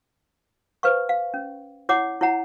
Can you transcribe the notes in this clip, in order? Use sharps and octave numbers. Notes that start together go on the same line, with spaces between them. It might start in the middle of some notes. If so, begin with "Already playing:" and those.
B4 C5 F5 C#6
F5
C#4
E4 C#5 F#5 D6
E4 C#5 F#5 A#5